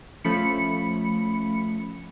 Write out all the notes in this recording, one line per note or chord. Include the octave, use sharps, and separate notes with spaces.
F3 A3 C#4 B5 C#7